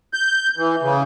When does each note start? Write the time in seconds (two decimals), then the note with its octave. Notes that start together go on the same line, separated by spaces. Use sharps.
0.14 G6
0.57 E3
0.82 C#3